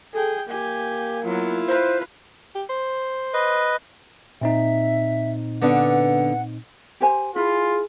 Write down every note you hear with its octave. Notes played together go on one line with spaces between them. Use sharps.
G#4 A4 G5
A#3 G4 G#5
F#3 B3 E4 F4
B4 C5 F5
G4
C5
B4 D#5
A#2 C4 D#4 E5
D3 B3 D4 F#5
G4 C5 G#5
E4 F4 G#4